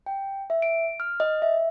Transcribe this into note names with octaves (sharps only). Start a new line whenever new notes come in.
G5
E5
D7
F6
D#5
E5